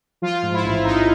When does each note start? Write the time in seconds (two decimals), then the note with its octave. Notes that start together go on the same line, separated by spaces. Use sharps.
0.22 F3 F4
0.43 G#2
0.54 E4
0.63 A1
0.84 A1 D#4